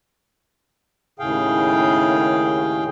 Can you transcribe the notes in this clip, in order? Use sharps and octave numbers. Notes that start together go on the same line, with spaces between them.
D#2 A2 C#3 G#4 F5 G5